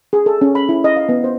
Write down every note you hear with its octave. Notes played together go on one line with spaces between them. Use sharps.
G#4
A4
C#4
B5
E4
D#5
F5
B3
C5